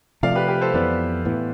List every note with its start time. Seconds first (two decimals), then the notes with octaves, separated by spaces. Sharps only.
0.23 C3 F3 A3 D5 F5
0.36 G4 B4
0.48 G4 B4
0.61 A4 C5
0.74 F2 E3 B3 B4 D5
1.25 A2 E3 B3